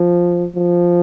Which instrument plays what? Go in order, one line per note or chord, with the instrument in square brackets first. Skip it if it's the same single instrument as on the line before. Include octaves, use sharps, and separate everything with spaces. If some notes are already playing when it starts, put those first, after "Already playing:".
Already playing: [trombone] F3
F3